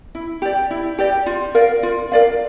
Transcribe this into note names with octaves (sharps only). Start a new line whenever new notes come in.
E4
G4 D5
E4
G4 D5
F4
A#4 D5 F5
F4
A#4 D5 F5